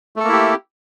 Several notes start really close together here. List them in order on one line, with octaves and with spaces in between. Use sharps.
A3 A4 A#3 E4 G4